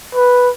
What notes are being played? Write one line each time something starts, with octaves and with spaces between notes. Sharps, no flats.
B4